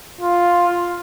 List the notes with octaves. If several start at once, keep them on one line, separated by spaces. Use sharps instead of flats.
F4